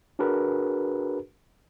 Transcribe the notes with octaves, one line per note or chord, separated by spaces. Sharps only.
D4 F#4 G#4 A#4 B4